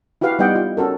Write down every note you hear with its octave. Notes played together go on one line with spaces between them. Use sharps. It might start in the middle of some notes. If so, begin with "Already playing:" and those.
E4 F#4 G4 B4 F5
G3 B3 D#4 D#5 F#5 G5
F4
C#4 F#4 A4 A#4